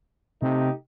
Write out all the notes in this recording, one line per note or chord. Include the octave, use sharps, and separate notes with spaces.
C3 A3 D#4 G4